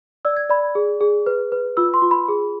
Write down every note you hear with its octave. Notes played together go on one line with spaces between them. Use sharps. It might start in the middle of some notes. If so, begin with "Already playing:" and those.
D5 E6
G#6
D5 B5
G#4
G#4
B4
B4
F4 E6
C6
F4
B5
G#4